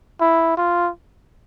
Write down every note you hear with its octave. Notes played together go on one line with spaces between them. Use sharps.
E4
F4